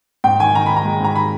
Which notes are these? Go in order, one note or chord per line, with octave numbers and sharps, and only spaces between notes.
G#2 G5
D#3 G#5
D#3 A#5
G#2 B5
A#5
G#3
G#2 A#5
D#3 B5